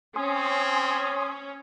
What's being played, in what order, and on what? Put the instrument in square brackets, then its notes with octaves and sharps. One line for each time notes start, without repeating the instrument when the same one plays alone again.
[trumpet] C4 [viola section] C#4 [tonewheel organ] G#5 C6 D#6